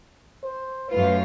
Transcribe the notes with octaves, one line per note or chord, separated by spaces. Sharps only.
C5
F#2 A3 F4 B4